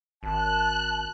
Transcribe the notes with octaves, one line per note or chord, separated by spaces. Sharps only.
G#1 A5 F#6